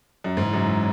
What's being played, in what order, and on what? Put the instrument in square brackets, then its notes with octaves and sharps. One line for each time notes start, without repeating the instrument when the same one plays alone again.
[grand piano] F#2
[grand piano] G#2 [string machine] C#3 E3 G#3 C#4 E4
[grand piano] F#2